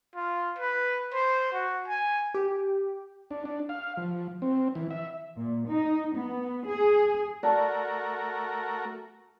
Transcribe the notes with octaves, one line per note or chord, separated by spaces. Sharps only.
F4
B4
C5
F#4
G#5
G4
D4
D4
F5
F3
C4
E3
E5
A#2
D#4
B3
G#4
A3 F#4 A#4 D5 A5